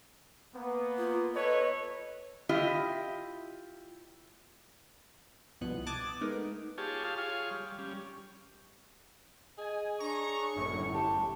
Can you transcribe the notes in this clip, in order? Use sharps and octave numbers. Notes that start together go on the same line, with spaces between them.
A#3 B3
F4
A4 B4 C#5 D#5
E4 F4 G4 D#5
C2 G2 B2 F3 B3 F#6
A5 D6 D#6 F#6 G#6 A6
G#3 A3 B3 D#4 A#4
F4 G4 G#4 C#5 A5
F4 G4 F5 A5
F4 G#4 C#5 F5
G3
G3 C#4
G#4 D#5 G#5
D4 C#5 A#5 C#6
G1 F#2 A2
G4 A5